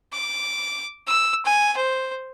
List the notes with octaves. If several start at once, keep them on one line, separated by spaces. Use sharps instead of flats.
D6
E6
G#5
C5